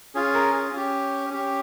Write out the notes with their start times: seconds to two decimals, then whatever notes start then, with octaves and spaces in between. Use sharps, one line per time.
0.15 C#4 F4 G#4
0.34 A#4
0.53 G#4
0.72 C#4 G4
1.30 C#4 G4